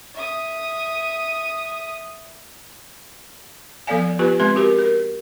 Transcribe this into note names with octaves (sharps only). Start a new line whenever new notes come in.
E5 D#6
F3 B3 A4 D5 F5 G#5
B3 F4 G4 B4
G#3 C4 B4 C6
F#4 G4 A#4
A#4